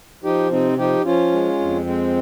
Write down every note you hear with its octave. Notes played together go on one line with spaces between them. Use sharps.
F3 D#4 G4
C3 C4 D#4
F3 D#4 G4
F3 C#4 F4
G#3
F2
G#3 C4